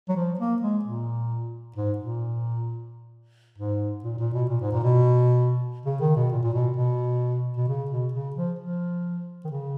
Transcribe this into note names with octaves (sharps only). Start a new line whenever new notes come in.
F#3
F3
A#3
G#3
A#2
G#2
A#2
G#2
A#2
A#2
B2
A#2
G#2
A#2
B2
C#3
D#3
B2
A#2
A#2
B2
B2
B2
C#3
B2
C#3
F3
F3
D#3
C#3